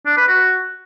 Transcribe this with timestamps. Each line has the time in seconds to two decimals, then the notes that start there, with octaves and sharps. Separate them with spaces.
0.06 D4
0.17 B4
0.28 F#4